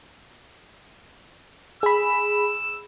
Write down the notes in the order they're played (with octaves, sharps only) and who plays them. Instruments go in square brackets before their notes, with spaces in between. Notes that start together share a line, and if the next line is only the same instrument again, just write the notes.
[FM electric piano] G#4 B5 [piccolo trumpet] E6